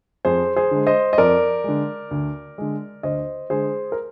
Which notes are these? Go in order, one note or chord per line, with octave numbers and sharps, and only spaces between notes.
F2 G#4 C5
G#4 C5
D3 G#3
C5 D#5
D#5
F2 A#4 D5
D3 G#3
D2
D3 G#3
D2 C5 D#5
D3 G#3 G#4 C5
A#4